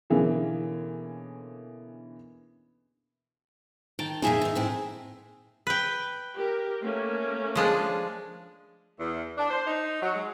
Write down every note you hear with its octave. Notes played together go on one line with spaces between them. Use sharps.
B2 D3 E3 A#3 C#4 G#4
D#3 G5 A5
F2 A#2 A#3 D#4 G#4 E5
G#2 D#3
A2 C4 E4
B4 G5
G4 A#4
A3 A#3 C#4
F3 G#3 D4
E2
D4
C5
D#4
F#3
G#3